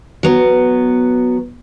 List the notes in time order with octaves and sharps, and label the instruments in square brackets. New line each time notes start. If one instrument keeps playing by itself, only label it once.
[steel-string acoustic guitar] F#3 B3